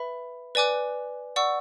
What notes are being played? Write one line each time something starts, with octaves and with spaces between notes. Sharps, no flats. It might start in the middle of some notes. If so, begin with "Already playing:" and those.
Already playing: B4 E5 B5
B4 D5 G#5 D6 F#6
D5 F#5 C#6 E6